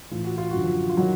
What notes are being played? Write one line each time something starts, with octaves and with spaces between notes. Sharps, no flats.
A2 E3 F4
F#4
F4
F#2 D3 F#4
F3 F4
F4
D#3 F#3 F#4